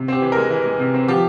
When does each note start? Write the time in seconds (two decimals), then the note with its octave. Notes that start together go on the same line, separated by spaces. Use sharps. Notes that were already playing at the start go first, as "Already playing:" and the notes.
Already playing: C3
0.08 C4 G4
0.22 E3
0.32 G#3 A#4
0.51 E3
0.65 G#3
0.79 C3
0.94 C4
1.08 F3 G4